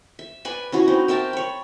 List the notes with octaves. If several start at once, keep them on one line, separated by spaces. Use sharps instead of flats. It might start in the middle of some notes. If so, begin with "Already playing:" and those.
E5
B4 D5 G#5 B5
C#4 E4 F#4
C4 D#4
A#4 E5 G5 A5
C#5 B5